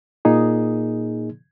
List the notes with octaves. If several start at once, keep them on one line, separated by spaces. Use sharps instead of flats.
A#2 A#3 D#4 G#4